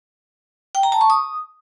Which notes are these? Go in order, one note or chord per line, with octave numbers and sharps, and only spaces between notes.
G5
A#5
A5
C#6
D#6